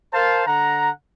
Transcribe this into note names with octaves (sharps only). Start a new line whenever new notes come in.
A#4 C5 F5 A5
D3 F#5 A#5